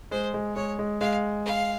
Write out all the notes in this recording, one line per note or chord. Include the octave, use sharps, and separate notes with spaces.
G#3 C5
G#3
G#3 C#5
G#3
G#3 F5
F5